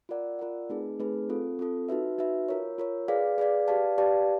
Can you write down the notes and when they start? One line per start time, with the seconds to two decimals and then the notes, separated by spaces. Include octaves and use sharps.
0.09 F4 A#4 D5 F#5
0.39 F4 A#4 D5 F#5
0.69 A3 C4 D#4 G#4 B4
1.00 A3 C4 D#4 G#4 B4
1.29 C4 F4 A4
1.59 C4 F4 A4
1.89 D#4 F#4 B4 E5
2.18 D#4 F#4 B4 E5
2.49 F4 A#4 C#5
2.78 F4 A#4 C#5
3.08 G#4 B4 D5 F5
3.38 G#4 B4 D5 F5
3.68 G4 B4 D5 F5 A5
3.98 G4 B4 D5 F5 A5